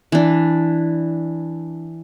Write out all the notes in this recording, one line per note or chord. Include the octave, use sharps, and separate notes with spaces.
E3 D4